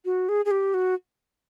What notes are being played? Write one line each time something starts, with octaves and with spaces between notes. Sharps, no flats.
F#4
G#4
G#4
G4
F#4